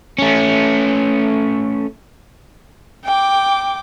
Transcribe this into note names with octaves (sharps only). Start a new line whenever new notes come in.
A3 C#4
G5 D6